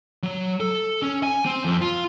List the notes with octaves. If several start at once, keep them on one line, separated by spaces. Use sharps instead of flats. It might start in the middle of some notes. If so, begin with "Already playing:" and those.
F#3
A4
C#4
G#5
C4
F2
F4